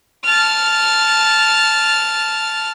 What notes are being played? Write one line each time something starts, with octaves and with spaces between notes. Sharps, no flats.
A5 F6